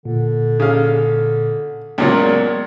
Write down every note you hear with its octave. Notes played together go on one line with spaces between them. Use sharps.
A#2 D3
C#3 F5
C#2 A#2 F#3 G#3 B3 A#4